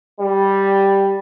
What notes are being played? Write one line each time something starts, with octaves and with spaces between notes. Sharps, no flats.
G3